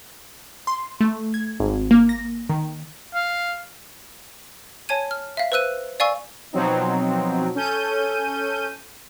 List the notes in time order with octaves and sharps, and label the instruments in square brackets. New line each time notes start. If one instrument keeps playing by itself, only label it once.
[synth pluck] C6
A3
G#6
G#1
A#3
A#6
D#3
[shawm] F5
[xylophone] C#5 G#5 A5 G#6 D#7
F6
E5 F5
B4 C5 E6 F#6 D#7
D5 F5 G#5 C#6 E6
[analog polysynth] B2 F3 F#3 C4 D#4
C#4 A4 G6 D#7